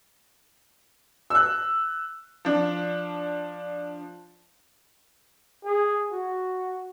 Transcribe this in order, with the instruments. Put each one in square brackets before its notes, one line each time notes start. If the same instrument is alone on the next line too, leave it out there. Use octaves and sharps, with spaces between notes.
[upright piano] E6 F#6
[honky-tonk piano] F3 D4
[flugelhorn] G#4
F#4